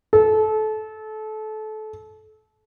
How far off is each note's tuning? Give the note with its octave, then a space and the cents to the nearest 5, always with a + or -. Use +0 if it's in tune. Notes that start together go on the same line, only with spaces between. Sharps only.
A4 -25